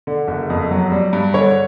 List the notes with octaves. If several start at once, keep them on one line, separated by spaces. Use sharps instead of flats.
D3
F#1
F2
F#3
G3
G2
D3 C#5